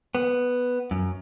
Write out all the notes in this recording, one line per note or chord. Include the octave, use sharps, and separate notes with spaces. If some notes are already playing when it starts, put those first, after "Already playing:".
B3
F#2